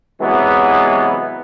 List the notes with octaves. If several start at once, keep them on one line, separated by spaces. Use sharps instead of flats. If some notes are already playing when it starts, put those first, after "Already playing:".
C3 E3 F#3 G#3 B3